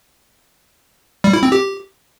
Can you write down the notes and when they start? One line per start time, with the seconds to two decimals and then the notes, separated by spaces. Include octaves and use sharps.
1.24 G3
1.33 E4
1.43 C4
1.52 G4